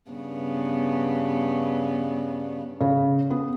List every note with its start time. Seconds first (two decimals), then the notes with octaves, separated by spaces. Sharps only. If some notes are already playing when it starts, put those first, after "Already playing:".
0.11 G2 C#3 B3
2.81 C#3
3.30 B3